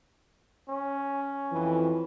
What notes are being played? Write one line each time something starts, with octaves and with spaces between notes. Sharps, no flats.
C#4
F2 E3